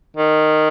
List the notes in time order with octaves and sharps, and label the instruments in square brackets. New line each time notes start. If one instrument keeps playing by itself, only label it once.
[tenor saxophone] D#3